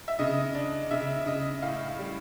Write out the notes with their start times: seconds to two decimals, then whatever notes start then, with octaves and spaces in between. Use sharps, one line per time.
0.08 E5
0.19 C#3 D#5
0.55 D4
0.91 C#3 E5
1.26 C#3 D#5
1.62 A2 F5
1.99 G3